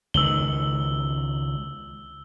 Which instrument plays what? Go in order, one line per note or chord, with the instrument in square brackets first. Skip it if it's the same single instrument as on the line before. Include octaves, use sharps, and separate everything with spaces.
[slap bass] C#2 D#3 [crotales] E6 F#7 G7